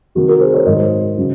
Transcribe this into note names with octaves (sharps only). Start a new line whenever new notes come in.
C3 D#3 F#3 F#4
F#4 A#4
G#4 C5
A#4 C#5
G#2 D#3 F#3 C5 D#5
C#3 F#3